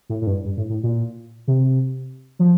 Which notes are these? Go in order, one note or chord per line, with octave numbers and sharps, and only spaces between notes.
A2
A2
G2
G2
A2
A2
A#2
C3
F3